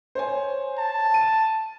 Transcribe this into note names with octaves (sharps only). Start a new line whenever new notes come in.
C5 C#5 G#5
A5
D#7